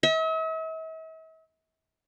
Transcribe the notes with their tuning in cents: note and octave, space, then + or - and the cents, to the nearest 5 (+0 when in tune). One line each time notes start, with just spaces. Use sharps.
E5 -45